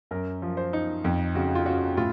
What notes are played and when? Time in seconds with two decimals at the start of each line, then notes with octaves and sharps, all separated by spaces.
0.11 F#2 A#4
0.42 F3
0.57 C5
0.73 D#4
1.04 F2
1.35 C#3 F#4
1.55 F4
1.66 C#4 F#4
1.97 A2 F4